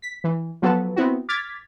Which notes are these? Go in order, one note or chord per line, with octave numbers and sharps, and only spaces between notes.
B6
E3
F3 F#3 B3 F#4 A4 B4
B3 C4 E4 F#4
D6 F6 G#6 A6 B6